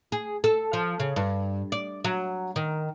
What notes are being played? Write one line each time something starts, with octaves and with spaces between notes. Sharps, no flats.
G#4
A4
F3
C#3
G2
D5
F#3
D#3